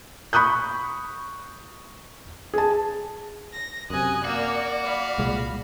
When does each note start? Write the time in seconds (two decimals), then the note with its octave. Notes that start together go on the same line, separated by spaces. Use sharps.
0.33 B5 C#6 D#6 F#6 G6
2.54 G#4 A5
3.53 A#6
3.90 F#2 C3 G#5 D#6 F#6
4.25 A#3 F#4 D5
4.83 F5 B5
5.18 C2 A#2 G#3